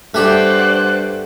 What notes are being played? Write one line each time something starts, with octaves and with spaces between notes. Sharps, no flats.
G2 A3 G4 C5 D5 F#5 F#6